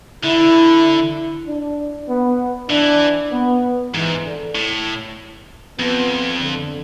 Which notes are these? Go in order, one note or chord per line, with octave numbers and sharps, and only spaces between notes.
D3 E4
D4
B3
E3 D4
B3
G#2 E3
D3
A2
F2 B3
D3